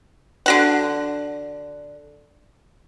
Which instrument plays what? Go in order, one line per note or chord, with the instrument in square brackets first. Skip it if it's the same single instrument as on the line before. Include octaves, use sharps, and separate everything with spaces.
[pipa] D3 F#4 F#5